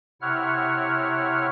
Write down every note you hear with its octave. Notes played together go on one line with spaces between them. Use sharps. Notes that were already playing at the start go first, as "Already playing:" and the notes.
C3 E4 C#5 F#5 F6